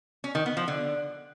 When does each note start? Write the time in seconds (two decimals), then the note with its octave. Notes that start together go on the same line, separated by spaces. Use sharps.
0.24 C#4
0.35 D#3
0.46 B3
0.57 F3
0.68 D3